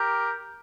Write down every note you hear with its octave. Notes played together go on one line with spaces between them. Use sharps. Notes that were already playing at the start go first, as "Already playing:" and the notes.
Already playing: G4 A#4